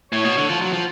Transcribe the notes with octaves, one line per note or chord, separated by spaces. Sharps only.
A2 C#5
B2
D3
F3
F#3
F3